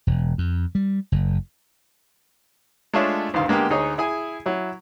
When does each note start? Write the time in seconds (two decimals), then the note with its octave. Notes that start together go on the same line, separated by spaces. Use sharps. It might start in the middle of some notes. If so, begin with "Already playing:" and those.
0.07 E1
0.38 F2
0.75 G3
1.12 F#1
2.93 G#3 A3 D4 F4 C#5 E5
3.34 D2 G2 D#3 F5 C6
3.48 D3 G#3 A#3 B3 G4
3.70 D2 D#4 G#4 C#5 D#5
3.98 E4 G#4 G#5
4.46 F#3 E4